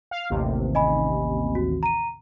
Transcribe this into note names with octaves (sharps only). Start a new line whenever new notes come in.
F5
A1 D#2 C3
D#5 G#5 B5
F#4
A#5 D#7